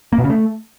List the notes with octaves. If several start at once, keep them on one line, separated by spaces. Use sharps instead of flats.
A#3
B2
C#3
A3